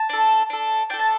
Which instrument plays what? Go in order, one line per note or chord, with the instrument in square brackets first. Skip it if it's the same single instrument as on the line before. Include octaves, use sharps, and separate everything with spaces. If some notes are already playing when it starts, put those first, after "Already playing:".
Already playing: [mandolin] A5
D4 A4
D4 A4
D4 A4 G5
A5